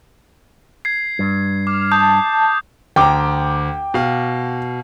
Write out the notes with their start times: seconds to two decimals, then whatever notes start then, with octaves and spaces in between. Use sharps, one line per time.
0.85 G#6 C7
1.19 G2
1.67 D6 F6
1.92 A5 D#6 G6
2.96 D2 G5 A#5 D6
3.94 B2 F5